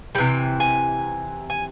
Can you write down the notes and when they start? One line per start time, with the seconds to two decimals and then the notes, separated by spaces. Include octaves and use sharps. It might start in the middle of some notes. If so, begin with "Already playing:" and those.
0.15 C3 E3 G3 G5
0.60 G#5
1.50 G#5